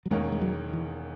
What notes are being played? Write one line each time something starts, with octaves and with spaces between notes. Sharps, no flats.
F#3
E1 E2 D#3 G#3 A#3 C#4
G#3
F#3
E3